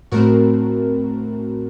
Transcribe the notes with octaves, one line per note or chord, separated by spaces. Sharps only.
A2 A3 C4 F#4 A#4